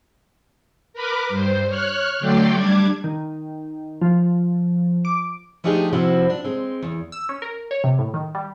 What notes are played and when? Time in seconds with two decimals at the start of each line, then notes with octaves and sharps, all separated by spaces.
0.93 A#4 B4 B5 D6
1.29 G2 C5
1.67 C#5 F6 F#6
2.20 D3 F#3 A3 D5 G5 C6
2.53 G3 D4 D6 G#6
3.04 D#3
4.01 F3
5.05 D6
5.64 F3 A3 D4 D#4 G4 G#4
5.93 C3 F3 C4 E4 F#4
6.30 D4
6.44 G#3 C4
6.83 E2
7.12 E6
7.29 C#4
7.42 A#4
7.71 C#5
7.84 C3
7.99 A2
8.14 D#3
8.35 G3